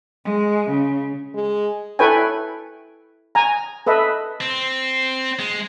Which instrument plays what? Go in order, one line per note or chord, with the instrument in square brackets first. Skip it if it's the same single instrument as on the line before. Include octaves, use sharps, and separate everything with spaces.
[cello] G#3
C#3
[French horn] G#3
[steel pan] E4 A4 B4 C#5 G5 G#5
G#5 A#5
A4 B4 D#5 E5
[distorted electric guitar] C4
G#3